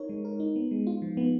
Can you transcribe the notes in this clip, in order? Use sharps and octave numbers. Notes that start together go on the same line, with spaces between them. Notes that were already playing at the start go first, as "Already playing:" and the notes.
Already playing: D#4 A#4 C#5
G#3
A#4
D#4
B3
G#3
F4
F3
B3